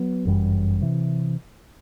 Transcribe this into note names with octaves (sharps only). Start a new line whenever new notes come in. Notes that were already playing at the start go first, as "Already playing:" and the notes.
Already playing: F#3 B3
G1 F#2 E3 G3
C3 E3